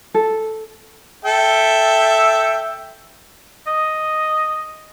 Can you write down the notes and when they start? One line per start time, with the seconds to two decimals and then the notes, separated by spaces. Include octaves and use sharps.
0.14 A4
1.25 A4 E5 G5
3.67 D#5